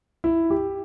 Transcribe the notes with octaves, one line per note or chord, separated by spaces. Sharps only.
E4
G4